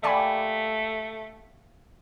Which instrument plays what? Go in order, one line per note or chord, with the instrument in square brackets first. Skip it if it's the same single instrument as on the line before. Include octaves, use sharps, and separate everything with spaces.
[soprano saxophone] A3 [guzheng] A#3 G4 A4 [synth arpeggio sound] D5 G#5 B5